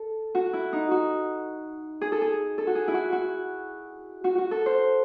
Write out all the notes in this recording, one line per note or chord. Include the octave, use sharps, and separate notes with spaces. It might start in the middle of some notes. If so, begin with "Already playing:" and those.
Already playing: A4
F#4
E4
D#4
F#4
G#4
A4
G#4
A4
F#4
G#4
E4
F#4
F#4
F#4
F#4
A4
C5